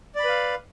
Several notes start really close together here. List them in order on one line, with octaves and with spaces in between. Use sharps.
D5 B5 B4 F5